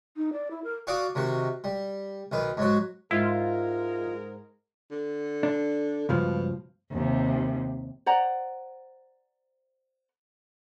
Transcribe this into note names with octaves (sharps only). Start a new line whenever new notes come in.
D#4
D5
E4
A#4
F#4 D5 F5 F#5 D6 D#6
C3 D#3 F#4
G3
B1 D#3 B4
G#2 F#3 F#4
G#2 G#3 E4 F4 A#4
D3
D4
C#2 G2 B2 F3
D#2 C3
C5 D5 F#5 A#5